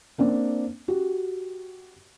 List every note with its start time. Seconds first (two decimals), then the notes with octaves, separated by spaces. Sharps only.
0.18 A#3 C4 D4
0.88 F#4 G4